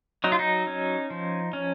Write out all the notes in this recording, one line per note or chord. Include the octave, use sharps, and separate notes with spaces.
F#3 D#4
F4
D#4
C#4
F3
C#4